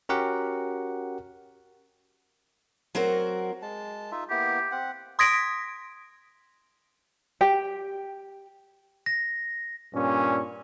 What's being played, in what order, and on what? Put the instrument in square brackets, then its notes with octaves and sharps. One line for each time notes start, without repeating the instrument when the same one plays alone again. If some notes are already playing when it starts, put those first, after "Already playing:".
[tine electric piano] C#4 F#4 G4 A#4 F#5
[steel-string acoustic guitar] F#3 C4 F#4 A#4
[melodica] G#3 A5
D#4 F4 E5
[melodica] A#3 B3 E4 [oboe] G4
[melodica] C4 F#5
[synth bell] C6 D#6 G#6 A#6 B6 D7
[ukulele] G4 G5
[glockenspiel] A#6
[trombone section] G2 A#2 C#4